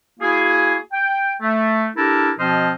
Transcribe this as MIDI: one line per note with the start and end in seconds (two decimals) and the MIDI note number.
0.20 0.77 58
0.20 0.77 64
0.20 0.77 66
0.20 0.77 68
0.92 1.33 79
1.41 1.87 57
1.96 2.32 62
1.96 2.32 64
1.96 2.32 67
1.96 2.32 69
1.96 2.32 70
2.38 2.71 47
2.38 2.71 53
2.38 2.71 60
2.38 2.71 72
2.38 2.71 75
2.38 2.71 89